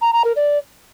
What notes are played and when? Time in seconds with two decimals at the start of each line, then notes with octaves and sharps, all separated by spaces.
0.01 A#5
0.12 A#5
0.24 A#4
0.36 D5